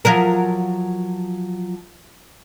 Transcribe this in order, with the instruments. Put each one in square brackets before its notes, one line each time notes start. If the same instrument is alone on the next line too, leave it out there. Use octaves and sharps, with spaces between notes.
[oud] F3 F#3 A#4